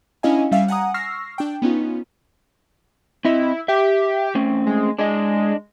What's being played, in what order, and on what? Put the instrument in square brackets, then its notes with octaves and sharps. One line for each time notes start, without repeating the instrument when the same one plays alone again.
[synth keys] C#4 D4 E4 D#5 F5 G#5
G3 C#4 E5 F5
F#5 G#5 A#5 D#6
C#6 E6 F6 A#6 C7
D4 G5
B3 C#4 D#4 F4
[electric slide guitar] C4 D#5 [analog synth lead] E4
[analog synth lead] G4 [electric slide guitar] E5
[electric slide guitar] A3 C4 C#4
[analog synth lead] G#3
[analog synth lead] G#3 [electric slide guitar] D4 D#5